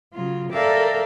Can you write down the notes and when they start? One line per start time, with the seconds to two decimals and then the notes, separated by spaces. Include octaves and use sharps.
0.12 C#3 F#3 F4
0.52 A4 A#4 D5 E5 F5 G5